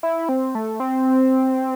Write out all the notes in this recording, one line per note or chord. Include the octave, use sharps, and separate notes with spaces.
E4
C4
A3
C4